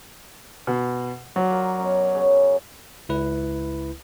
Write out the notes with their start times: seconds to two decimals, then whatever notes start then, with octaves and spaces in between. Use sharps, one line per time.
0.67 B2
1.36 F#3 D5 C6
1.51 F4 A#4
1.78 F#2 B2
2.15 C#3
3.09 C#2 E4 B4